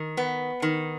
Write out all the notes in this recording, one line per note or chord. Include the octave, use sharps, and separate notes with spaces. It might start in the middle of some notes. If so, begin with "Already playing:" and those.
Already playing: D#3
B3
D#3